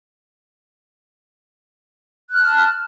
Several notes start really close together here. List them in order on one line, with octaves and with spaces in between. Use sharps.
F#6 F6 A5